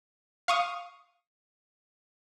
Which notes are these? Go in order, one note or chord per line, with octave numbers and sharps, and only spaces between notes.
F5 C#6 D#6